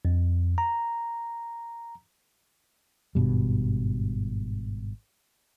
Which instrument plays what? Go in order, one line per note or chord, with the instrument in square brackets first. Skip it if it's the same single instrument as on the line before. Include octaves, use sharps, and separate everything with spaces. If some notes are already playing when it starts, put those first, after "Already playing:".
[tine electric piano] F2
A#5
[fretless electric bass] G#1 G2 B2 G3